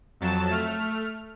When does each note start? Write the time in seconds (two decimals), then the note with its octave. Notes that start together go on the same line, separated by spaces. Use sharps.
0.21 F2 F#3 A5 E7
0.50 A3 F6